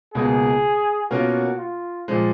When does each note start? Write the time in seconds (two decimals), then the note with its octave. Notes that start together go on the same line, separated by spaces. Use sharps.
0.14 C#2 B2 A#3 G#4
1.11 B2 A#3 C#4 F4 F#4 A#4
1.59 F4
2.08 A#2 F3 G#3